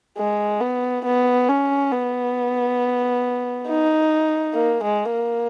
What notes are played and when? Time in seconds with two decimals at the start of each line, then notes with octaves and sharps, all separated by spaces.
0.18 G#3
0.60 B3
1.05 B3
1.49 C#4
1.92 B3
3.68 D#4
4.54 A#3
4.84 G#3
5.13 A#3